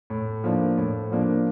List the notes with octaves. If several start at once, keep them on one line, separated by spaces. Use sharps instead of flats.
A2
F3 A#3 D4
A2
F3 A#3 D4